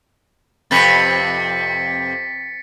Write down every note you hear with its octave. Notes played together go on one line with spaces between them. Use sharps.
F2 C3 B4 A6 B6 C#7